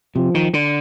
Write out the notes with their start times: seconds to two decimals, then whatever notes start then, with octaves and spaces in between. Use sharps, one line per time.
0.15 C3 F3
0.35 D#3
0.53 D3